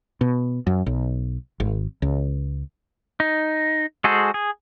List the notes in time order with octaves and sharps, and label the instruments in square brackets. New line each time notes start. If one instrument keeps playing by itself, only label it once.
[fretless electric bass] B2
F#2
B1
G#1
C#2
[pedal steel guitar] D#4
G#3 F#4 G#4 A4 C5
G#4